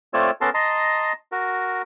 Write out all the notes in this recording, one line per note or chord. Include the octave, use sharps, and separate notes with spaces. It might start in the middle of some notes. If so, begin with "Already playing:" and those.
A3 C4 F4 C#5 D5 E6
B3 C#4 A4 A#4 A5 C6
D#5 A5 A#5 C6
F#4 A#4